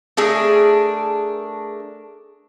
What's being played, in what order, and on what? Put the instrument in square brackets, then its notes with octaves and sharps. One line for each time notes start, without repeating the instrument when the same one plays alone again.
[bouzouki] A3 D4 G#4 A#4